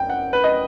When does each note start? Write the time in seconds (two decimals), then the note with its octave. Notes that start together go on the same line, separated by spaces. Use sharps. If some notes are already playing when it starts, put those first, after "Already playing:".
Already playing: F#2 G5
0.10 F#5
0.33 B4
0.44 D#5